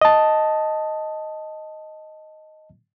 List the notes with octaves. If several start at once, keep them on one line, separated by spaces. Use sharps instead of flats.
D#5 A5